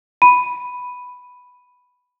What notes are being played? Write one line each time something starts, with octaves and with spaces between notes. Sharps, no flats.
B5 D#7